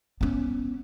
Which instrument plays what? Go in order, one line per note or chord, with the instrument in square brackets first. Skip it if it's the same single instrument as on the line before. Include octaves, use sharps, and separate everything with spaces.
[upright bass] B3 C#4